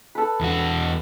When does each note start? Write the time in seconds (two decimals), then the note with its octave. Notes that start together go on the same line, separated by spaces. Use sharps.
0.15 A4 B4
0.41 E2 F#4